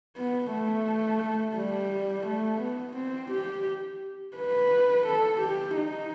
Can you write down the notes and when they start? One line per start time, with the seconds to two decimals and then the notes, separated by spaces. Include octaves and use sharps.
0.17 B3
0.52 A3
1.56 G3
2.26 A3
2.61 B3
2.97 C4
3.31 G4
4.37 B4
5.07 A4
5.41 G4
5.77 D#4